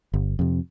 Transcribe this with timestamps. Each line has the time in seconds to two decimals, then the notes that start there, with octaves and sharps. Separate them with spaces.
0.14 G1
0.39 F2 C3